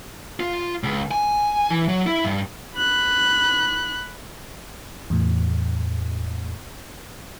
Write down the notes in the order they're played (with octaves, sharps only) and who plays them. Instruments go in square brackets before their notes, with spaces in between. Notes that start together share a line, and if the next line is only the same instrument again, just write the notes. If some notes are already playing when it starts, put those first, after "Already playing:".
[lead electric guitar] F4
C#2
G#5
E3
F#3
E4
G2
[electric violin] B5 F#6
[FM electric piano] E2 A2